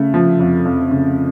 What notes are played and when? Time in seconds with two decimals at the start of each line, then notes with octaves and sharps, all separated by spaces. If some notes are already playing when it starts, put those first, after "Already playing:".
Already playing: C#3 A3
0.14 F3
0.40 F2
0.65 F2
0.91 C#3